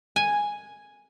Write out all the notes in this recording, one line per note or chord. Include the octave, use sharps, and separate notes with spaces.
G#5